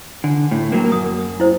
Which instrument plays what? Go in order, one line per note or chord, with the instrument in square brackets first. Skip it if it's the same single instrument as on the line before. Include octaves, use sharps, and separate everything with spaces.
[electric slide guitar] D3 [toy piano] G#5
[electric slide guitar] A2
F#3 A#3
[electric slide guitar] F#2 [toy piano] D#6
[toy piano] E4 C5